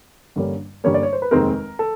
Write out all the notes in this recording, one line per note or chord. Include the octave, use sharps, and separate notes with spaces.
G2 D3 G3 A#3 C#4
G2 D3 G3 A#3 C#4 C#5
D5
C#5
C5
B4
F1 D#2 D#3 G#3 C4 A#4
A4